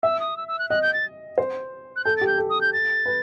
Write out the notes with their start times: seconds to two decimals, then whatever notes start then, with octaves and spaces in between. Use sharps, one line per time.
0.03 E5 E6
0.20 D#6
0.37 E6
0.48 E6
0.59 F#6
0.70 D#5 F#6
0.82 G6
0.93 A6
1.38 C5
1.96 F#6
2.05 A4 G6
2.17 G4 A6
2.27 G6
2.38 A4
2.50 D#6
2.61 G6
2.73 A6
3.06 B4